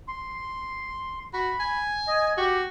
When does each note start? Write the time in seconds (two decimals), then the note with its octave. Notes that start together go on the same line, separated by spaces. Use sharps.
0.08 C6
1.34 F#4 B5
1.60 G#5
2.07 D#5
2.38 F#4 G4